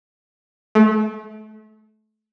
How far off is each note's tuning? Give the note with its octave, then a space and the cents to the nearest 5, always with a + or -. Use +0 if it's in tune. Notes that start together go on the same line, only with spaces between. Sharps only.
A3 -30